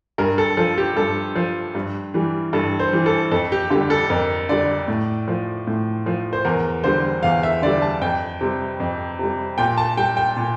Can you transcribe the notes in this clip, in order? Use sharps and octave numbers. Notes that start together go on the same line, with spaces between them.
G2 A#4
A4
F3 A4
G4
G2 A4
F3
G2
E3 G3
G2 A4
C5
E3 G3
A4
F2 A4
G4
D3 G4
G3
A4
F2 A#4
D3 G3 D5
A2
F3
A2
F3
C5
E2 A#4
D3 G3 C5
E2 F5
E5
D3 G3 D5
A5
F2 G5
C3 G3
F2
C3 G3
A#2 G5
A5
G3 G5
G5
A#2